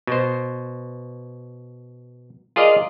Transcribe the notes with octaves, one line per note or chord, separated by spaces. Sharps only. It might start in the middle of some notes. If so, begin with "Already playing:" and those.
B2 C5
F4 G#4 A#4 D5 D#5 F5